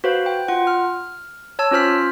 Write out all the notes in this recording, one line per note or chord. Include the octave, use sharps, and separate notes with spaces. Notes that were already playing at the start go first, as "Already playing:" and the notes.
F#4 B4 C5 F5
G5
F4 F#5
F6
C#5 A5 E6
C#4 F4 C5 F6 B6